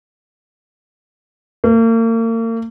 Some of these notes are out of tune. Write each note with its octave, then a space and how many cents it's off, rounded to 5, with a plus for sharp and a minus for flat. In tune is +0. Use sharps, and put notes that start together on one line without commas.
A#3 -40